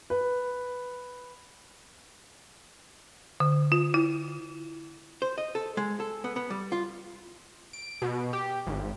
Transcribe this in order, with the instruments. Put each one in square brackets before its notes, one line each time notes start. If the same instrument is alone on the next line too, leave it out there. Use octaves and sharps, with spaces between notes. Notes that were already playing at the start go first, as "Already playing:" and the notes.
[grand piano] B4
[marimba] D3
F4
E4
[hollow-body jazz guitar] C5
D#5
A4
G#3
A4
B3
B3
G3
F4
[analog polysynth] D7
B2
G4
G#1